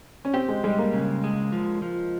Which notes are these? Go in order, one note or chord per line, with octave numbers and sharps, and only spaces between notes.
C#4
C4 G4
G#3
G3 G#3
A#3
C#3
G#3
F3
F3